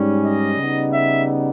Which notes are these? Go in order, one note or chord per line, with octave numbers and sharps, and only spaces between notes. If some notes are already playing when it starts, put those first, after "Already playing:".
Already playing: G#2 G3 C#4
D#5
C#3 G3 B3 D#4
E5